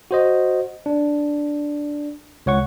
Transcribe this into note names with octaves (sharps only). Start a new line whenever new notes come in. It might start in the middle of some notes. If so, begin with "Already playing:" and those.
F#4 C5 D#5
D4
C#2 C#5 F#5 C#6